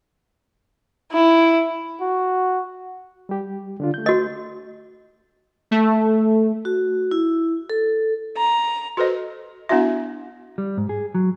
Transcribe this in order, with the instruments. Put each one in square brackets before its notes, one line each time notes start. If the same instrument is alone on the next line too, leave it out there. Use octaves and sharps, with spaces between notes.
[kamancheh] E4
[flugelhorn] F#4
[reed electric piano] G3 G4
D3 D4 F4
A3 G6
[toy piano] F#4 D#5
[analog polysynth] A3
[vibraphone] F#4
E4
A4
[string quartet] A#5
[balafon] F#4 A4 B4 C5 D#5
B3 D4 E4 F#4 E5
[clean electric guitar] G3
G#2
G#4
F#3